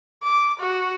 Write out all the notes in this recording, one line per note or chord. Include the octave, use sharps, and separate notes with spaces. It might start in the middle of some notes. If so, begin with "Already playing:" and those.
D6
F#4